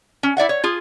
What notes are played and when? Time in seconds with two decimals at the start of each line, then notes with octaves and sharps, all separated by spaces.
0.23 C#4
0.37 E4 D5 E5 F#5
0.49 C#5
0.64 F4 G#4